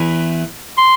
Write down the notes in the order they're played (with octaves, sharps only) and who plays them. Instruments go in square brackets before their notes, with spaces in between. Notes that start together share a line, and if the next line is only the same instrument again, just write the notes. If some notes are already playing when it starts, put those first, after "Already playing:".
Already playing: [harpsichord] E2 E3
[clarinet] C6